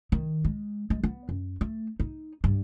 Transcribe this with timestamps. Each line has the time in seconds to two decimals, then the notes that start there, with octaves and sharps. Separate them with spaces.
0.12 D#3
0.45 G#3
0.90 G#3
1.04 B3
1.29 F#2
1.61 A3
2.00 D#4
2.44 G2